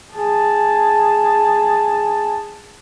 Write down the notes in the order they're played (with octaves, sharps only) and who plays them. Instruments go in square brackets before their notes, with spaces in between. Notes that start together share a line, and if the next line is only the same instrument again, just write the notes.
[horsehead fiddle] G#4 A5